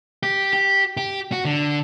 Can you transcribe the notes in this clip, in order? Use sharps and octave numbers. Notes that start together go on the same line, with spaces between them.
G4
G4
G4
F#4
D3